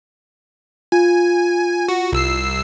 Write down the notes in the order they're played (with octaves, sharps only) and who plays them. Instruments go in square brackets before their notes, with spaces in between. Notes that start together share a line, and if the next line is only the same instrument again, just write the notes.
[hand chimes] F4 [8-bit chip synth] G#5
[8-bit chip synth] F#4
C2 E6 C7